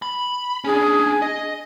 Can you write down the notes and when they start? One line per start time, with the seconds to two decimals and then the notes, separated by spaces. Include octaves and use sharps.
0.02 B5
0.64 C#4 D4 G#4
1.22 D#5